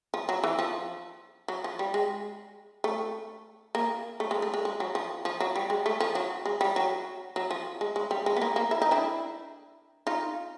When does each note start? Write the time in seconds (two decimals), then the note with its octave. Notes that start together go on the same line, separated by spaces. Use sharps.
0.14 F3
0.29 F#3
0.44 E3
0.59 F3
1.48 F#3
1.64 F3
1.79 G3
1.94 G#3
2.84 A3
3.75 A#3
4.20 A3
4.31 G#3
4.42 A3
4.54 G#3
4.65 G#3
4.80 F#3
4.95 F3
5.25 F3
5.40 F#3
5.56 G3
5.70 G#3
5.86 A3
6.00 F3
6.15 F#3
6.46 G#3
6.61 G3
6.76 F#3
7.36 F#3
7.51 F3
7.81 G#3
7.96 G#3
8.11 G3
8.26 G#3
8.37 B3
8.42 A#3
8.56 A#3
8.71 E4
8.82 D#4
8.91 D4 E4
10.07 D#4 F4